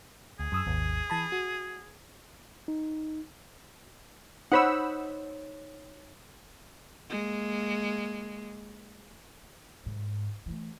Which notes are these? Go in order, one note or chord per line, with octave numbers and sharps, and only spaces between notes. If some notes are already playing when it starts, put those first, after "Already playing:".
D2 G#4
F#2 D#6 E6
G#1 D#2
E3 A5 B5
F#4
D#4
D#4 C5 C#5 F#5 B5 E6
G#3 A#3
G#2
E3 A3